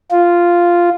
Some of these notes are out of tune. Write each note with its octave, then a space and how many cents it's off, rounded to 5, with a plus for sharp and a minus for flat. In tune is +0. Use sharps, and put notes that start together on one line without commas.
F4 -5